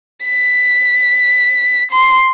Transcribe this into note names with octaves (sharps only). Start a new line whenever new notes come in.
B6
C6